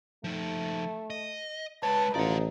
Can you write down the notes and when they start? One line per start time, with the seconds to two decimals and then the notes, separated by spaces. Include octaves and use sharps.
0.24 F3 A3 D#4
1.10 D#5
1.83 G#3 B4 C#5 A5
2.15 A1 D#4 F4 D5 F#5